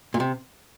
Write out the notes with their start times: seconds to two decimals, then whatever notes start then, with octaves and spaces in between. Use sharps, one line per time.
0.14 A#2
0.20 C3